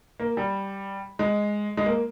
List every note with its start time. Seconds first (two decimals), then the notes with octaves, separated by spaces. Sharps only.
0.20 A#3
0.37 G3
1.19 G#3
1.77 G#3
1.86 A#3